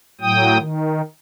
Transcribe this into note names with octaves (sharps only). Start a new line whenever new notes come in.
A2 F#3 G5 D#6
D#3